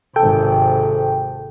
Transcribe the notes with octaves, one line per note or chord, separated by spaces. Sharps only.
G#1 C3 A4 G5